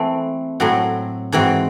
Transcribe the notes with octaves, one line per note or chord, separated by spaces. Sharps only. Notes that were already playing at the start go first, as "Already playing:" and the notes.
Already playing: E3 A3 C4
A2 F#3 C4 F#4
G#2 E3 C4 F#4